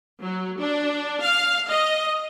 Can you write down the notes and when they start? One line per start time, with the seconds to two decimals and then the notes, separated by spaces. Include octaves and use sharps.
0.23 F#3
0.60 D4
1.22 F5
1.70 D#5